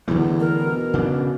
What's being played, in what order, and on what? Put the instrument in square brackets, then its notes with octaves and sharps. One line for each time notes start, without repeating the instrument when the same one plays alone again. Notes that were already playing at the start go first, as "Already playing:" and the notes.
[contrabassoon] E2 [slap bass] D3 E3 A3
[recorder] A#4
[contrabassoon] B2
[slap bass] C#3 D4